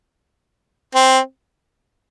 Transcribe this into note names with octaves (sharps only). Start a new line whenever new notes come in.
C4